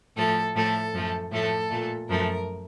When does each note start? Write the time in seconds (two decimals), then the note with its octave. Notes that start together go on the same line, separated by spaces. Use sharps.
0.16 A2 F3 A3 A4
0.55 A2 F3 A3 A4
0.93 F#2 F3 A3
1.31 A2 F3 A3 A4
1.70 A#2 A3
2.09 F#2 F3 A3 A#4